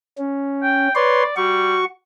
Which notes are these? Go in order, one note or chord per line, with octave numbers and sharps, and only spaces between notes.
C#4
G5
B4 C#5 D5 C6
G3 F#4 C#6